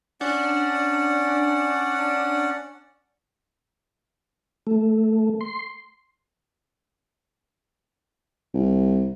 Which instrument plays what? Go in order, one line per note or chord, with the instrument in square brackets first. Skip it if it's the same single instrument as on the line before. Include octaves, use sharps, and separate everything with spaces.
[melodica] C#4 D5 F#5 [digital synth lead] D4
[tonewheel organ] A3
C6
[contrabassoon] C2